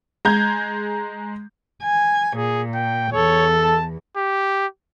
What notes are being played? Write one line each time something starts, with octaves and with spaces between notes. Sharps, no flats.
G#3 A#5 G6 G#6
G#5
A#2 G#4
G5
E2 A4 C#5
A5
G4